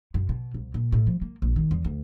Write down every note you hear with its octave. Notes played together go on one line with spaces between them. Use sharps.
F#2
B2
C2
A#2
A2
F3
A#3
A#1
D#3
E2
D2